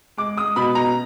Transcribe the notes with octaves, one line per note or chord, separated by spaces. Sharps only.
G#3 D6
G#3 D#6
B2 B5
B2 A#5